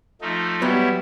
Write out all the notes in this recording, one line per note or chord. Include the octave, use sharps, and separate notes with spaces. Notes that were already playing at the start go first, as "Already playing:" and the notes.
F3 A3 D#4
F#3 G3 B3 E4 C#5